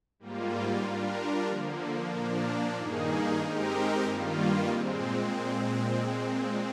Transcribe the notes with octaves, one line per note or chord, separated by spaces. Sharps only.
G#2 G3 A#3 F4
G3 D4 F4 A#4
D3 F3 A#3
A#2 F3 A#3 D4
G2 D#3 A#3 D#4 G#4
G#3 C4 D#4 G4 A#4
G2 D#3 G3 A#3 F4
A#2 G#3 C4